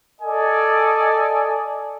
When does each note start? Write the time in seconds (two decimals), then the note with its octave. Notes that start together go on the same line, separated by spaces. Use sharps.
0.21 A4 D5 D#5 G#5